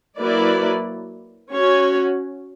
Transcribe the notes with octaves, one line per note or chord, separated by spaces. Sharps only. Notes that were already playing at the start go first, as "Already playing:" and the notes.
F#3 A#3 E4 B4 D5
C#4 F#4 C#5